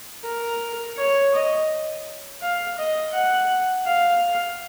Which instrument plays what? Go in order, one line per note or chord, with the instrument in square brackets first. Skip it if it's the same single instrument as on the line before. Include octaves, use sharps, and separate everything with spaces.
[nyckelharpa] A#4
C#5
D#5
F5
D#5
F#5
F5